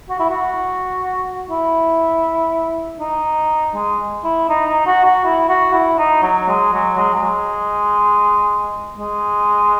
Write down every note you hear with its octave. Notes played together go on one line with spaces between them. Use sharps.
F#4
E4
F#4
E4
D#4
G#3
E4
D#4
D#4
F#4
F#4
E4
F#4
E4
D#4
F#3
G#3
F#3
G#3
F#3
G#3
G#3